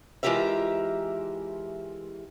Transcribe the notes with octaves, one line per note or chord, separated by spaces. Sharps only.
E3 G#3 F4 G4 A#4 E5